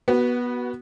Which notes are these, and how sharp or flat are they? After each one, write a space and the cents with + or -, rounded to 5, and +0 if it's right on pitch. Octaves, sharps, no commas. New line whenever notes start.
B3 -15 F#4 +15